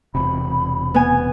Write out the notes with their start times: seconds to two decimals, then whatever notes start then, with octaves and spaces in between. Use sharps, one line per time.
0.15 E1 C3 B5
0.94 B3 G#5